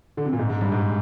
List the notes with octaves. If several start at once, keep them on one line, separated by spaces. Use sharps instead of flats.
D3
C3
A#2
G#2
G#2
G2
G#2